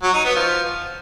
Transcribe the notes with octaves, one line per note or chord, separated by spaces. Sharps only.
F#3
D#4
B3
F3